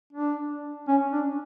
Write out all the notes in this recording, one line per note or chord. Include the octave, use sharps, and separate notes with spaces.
D4
C#4
D4